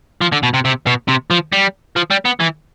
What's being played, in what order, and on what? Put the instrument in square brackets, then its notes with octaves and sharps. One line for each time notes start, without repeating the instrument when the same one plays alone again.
[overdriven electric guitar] F3
D3
B2
C3
C3
B2
C3
F3
G3
F3
G3
B3
E3